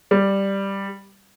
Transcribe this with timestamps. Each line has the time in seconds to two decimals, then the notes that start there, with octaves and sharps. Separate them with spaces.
0.11 G3